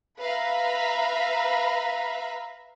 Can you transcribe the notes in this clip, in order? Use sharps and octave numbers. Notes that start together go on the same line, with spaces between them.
B4 E5 F5 A#5 B5